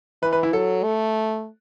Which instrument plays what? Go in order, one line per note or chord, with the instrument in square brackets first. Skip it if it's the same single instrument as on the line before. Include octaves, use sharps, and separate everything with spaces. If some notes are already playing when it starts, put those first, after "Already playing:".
[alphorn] E3 [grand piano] B4
[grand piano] B4
E4
[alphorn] F#3 [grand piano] A4
[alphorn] A3